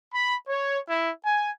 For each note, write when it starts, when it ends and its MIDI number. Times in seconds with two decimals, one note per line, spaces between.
0.14 0.36 83
0.48 0.78 73
0.89 1.11 64
1.25 1.50 80